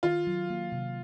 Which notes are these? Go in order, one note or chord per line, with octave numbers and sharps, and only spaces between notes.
D#3 F4
F#3
A#3
C3